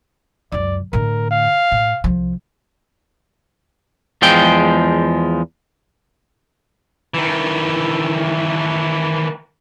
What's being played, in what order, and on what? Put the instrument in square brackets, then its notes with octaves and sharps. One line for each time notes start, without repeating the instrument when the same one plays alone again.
[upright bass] C#2 F#2 [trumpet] D5
[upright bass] A2 D3 [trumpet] A#4
[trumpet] F5
[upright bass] A2
C2 F3
[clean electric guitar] E2 F3 G#3 G5
[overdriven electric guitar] D#3 E3